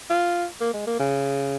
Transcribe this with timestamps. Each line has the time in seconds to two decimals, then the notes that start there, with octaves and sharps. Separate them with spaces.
0.10 F4
0.61 A#3
0.74 G#3
0.87 A#3
0.99 C#3